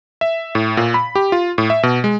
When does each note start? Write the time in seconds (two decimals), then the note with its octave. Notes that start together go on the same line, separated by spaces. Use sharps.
0.21 E5
0.55 A2
0.77 A#2
0.94 B5
1.15 G4
1.32 F4
1.58 A2
1.70 E5
1.83 B2
2.04 G#3